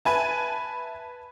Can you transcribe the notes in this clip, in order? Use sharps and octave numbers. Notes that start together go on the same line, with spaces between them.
B4 E5 G#5 A5 B5